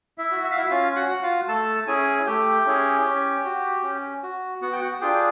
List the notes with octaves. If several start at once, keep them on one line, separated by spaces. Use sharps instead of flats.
E4 E5
F#4
E5
F5
E4 E5
C#4 F4 F5
F#4 F#5
F#4
F4 F5
A3 A4 A5
C#4 E4 G#4 G#5
A3 G4 G5
C#4 E4 G#4
C#4
F#4
C#4
F#4
B3 F#4 F#5
G5
F#4 F#5
D4 F4 G4 G#4 G5